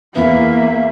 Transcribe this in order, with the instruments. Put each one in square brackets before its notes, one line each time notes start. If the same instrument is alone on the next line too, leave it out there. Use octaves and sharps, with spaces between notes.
[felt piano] E2 B3 [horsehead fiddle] A#3 [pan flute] E5